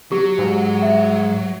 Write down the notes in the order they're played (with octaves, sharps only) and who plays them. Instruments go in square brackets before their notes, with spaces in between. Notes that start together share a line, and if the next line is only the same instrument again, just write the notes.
[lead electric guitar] F#3 [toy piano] G4
[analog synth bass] G#2
[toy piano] E5